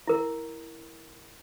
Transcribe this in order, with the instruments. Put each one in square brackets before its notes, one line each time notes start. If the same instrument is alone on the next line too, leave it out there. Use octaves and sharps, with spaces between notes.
[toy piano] E4 A#4